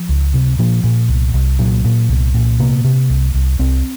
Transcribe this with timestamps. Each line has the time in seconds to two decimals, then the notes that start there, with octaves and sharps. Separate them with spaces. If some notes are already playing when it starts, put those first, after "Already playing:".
Already playing: F3
0.09 C#2
0.34 C3
0.59 A#2 F3
0.84 A#2
1.09 C2
1.34 C2
1.59 A#2 F#3
1.85 A#2
2.09 C2
2.34 A#2
2.59 C3 A#3
2.84 C3
3.10 C2
3.34 C2
3.59 C2 C4